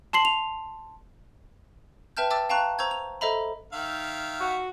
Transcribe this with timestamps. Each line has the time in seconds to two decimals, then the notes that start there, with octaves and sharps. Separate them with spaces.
0.13 A5 C6 C7 F#7
0.25 F7
2.17 B4 E5 G5 A5 F6 G6
2.30 E5 G5 A5 D6 E6 A6
2.49 F5 G5 A5 A#5 C#6 F#6
2.79 C5 A#5 C#6 E6 G6 G#6
2.91 F7
3.21 A4 C5 D#5 E5 A#5 B5
3.73 D#3 E5 F5
4.40 F#4